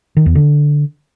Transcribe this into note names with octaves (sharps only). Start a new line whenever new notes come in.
D#3
E2
D3